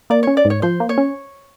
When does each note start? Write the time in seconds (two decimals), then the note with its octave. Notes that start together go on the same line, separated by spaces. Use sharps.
0.10 A#3 D5
0.23 C#4 C#5
0.37 D5
0.45 G#2
0.50 C#5
0.62 F3 C5
0.80 A#3
0.89 C#5
0.98 C#4